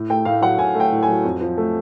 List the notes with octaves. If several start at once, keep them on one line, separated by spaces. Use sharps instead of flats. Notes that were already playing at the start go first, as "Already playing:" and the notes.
Already playing: A2
A3 G5
A2 F5
F#3 F#5
A2 G#5
A3 G5
A2
G#5
F#3
F2
F3
A3